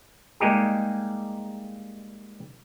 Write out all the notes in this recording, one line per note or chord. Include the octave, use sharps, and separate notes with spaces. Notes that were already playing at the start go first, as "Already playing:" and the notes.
G3 G#3 A#3 D#4 G4 G#4